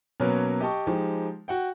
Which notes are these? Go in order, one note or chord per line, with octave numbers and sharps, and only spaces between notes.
B2 F#3 A#3 C#4 A#4 B4
G4 D#5 G5 A5 C#6
F3 G#3 D#4 G4
F#4 F#5 G5